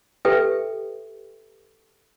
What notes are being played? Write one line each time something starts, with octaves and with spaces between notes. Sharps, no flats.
G4 A4 B4 E5 G5